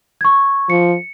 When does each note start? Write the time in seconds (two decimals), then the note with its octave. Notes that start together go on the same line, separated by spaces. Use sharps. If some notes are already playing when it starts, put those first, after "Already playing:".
0.21 C#6 G#6
0.70 F3 C#7